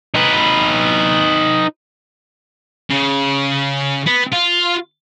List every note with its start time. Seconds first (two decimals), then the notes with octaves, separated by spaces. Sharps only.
0.14 D#4 B4
2.90 C#3
4.06 B3
4.32 F4